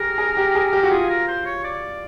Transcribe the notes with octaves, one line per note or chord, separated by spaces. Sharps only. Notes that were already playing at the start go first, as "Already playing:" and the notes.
Already playing: G4 G#4 A#4
G#4
G4
G#4
G4
F#4
F4 G#4
A#4
C5
C#5
D5